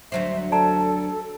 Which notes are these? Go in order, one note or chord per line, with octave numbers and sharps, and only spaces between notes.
D2 F#3 C5 E5
A4 D5 A5 A#5